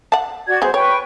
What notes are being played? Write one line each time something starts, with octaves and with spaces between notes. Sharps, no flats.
F#5 A5
F#4 D5 G#6
F#3 B3 G#4 C5
B4 C#5 G5 C#6